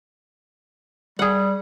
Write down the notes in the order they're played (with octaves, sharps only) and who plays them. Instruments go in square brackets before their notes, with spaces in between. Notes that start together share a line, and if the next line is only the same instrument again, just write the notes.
[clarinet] G3 [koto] G#4 F#5